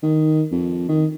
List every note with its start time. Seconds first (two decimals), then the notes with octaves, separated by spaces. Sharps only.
0.03 D#3
0.52 F2
0.88 D#3